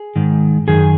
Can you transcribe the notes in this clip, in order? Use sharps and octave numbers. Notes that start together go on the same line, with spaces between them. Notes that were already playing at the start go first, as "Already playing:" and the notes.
Already playing: G#4
G#2 D#3
F#2 D#3 G#4